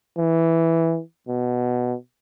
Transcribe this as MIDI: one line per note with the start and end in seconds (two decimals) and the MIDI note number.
0.18 1.01 52
1.28 1.95 47